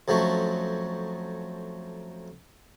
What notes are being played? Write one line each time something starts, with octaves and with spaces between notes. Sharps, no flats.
F2 F3 F#3 A3 C#4